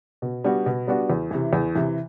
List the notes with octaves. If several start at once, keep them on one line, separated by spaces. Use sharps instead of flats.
B2
G3 B3 D4 F#4
B2
G3 B3 D4 F#4
E2
C3 E3
E2
C3 E3